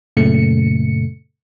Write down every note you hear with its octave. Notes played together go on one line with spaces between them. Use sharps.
F#2 A#2 C#3 A3 C#7